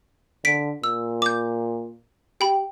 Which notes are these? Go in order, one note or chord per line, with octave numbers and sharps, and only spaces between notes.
D3 B6 D7
A#2 E6
D6 G6
G4 G5 B5